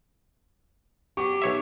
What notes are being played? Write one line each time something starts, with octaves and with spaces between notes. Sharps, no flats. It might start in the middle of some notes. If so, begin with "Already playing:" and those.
F#3 B3 G4 C#6
B1 C#5 E5